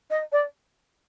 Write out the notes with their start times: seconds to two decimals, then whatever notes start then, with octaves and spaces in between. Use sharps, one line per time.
0.10 D#5
0.32 D5